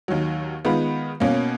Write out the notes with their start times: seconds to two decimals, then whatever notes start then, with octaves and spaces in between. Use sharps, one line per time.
0.08 D#2 D#3 F#3
0.65 D#3 G#3 B3 F4 B4
1.20 B2 A#3 C#4